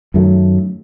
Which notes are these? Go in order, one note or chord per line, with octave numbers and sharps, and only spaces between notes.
F#2 D#3 F#3 A3